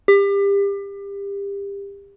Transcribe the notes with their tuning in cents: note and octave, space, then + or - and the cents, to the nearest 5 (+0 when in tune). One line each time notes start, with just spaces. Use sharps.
G4 +30